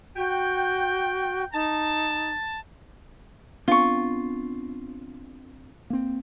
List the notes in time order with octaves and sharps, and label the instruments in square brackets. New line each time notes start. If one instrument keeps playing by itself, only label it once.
[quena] F#4 [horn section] G5
[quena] D#4 [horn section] A5
[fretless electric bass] B3 C4 D4 [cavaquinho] F4 C#6
[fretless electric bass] A#3 C4